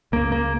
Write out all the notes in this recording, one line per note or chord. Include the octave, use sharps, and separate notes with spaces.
C#2 C#3 A#3
A#3